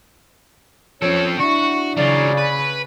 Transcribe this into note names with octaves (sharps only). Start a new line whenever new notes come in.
F3 C4 C#4 A4 C#5
D4 E4 F#4 C#6
C#3 F#3 F4 D5
B4